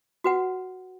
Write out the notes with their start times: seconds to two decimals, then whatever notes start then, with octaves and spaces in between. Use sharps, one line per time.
0.24 F#4 B4 F#5